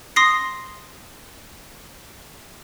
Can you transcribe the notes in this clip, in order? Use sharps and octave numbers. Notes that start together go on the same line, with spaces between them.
C6 D#6 A#6 C7